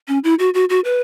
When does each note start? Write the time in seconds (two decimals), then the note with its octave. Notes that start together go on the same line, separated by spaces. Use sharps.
0.08 C#4
0.24 E4
0.39 F#4
0.54 F#4
0.69 F#4
0.85 B4